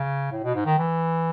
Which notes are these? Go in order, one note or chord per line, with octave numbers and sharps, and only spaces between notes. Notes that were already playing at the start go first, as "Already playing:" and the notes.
Already playing: C#3
A2
B2
G#2
D#3
E3